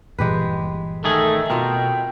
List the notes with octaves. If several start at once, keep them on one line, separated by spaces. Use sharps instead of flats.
G1 A#2 E3 G#3 G4 B4
D#3 A3 G#4 A4
B2 C4 F4 A#4 G5